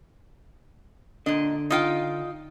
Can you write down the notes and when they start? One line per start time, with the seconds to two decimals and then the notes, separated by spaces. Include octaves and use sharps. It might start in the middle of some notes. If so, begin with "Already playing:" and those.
1.26 A#2 D3 D4 D#5
1.70 D#4 F4 G5